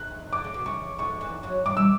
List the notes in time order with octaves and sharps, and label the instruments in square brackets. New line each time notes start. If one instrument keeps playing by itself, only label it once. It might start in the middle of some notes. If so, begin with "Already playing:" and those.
Already playing: [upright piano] F#6
[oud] D3 [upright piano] D6
[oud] C#3
B2
[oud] C#3 [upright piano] C#6
[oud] D2 D3 [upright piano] C#6
[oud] E2 E3
F#2 F#3
[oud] G2 G3 [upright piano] D6
[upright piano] E6